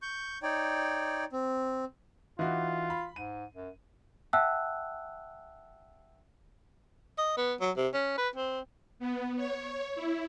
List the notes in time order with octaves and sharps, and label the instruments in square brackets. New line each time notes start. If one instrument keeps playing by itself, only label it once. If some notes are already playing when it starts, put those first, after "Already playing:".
[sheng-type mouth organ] C#6 G6
D#4 C#5 D5 G5
C4
[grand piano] E3 D#4 F#4 [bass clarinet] F4
[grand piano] B5
[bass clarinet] G#2 [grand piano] D#7
[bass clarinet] F#2
[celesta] E5 F#5 G5 A5 E6 F#6
[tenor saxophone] D#5
B3
F#3
C3
C#4
B4
C4
[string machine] B3
C#5
E4